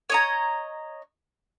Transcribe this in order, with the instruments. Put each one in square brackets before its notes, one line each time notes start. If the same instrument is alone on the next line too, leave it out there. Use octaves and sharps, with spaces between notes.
[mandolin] C#5 D#5 A#5